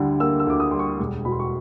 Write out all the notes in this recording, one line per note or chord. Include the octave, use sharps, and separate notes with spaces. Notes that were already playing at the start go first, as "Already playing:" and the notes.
Already playing: D2 D3 G3
A#3 E6
E6
D2 D6
D#6
G3 C6
C#6
E1
B2 B5
C6
C#6